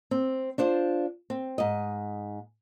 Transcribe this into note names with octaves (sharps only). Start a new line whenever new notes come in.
C4
D4 F4 C5 D5
C4
G#2 D#5